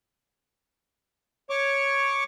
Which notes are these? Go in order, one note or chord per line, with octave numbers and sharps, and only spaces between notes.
C#5 C#6 D6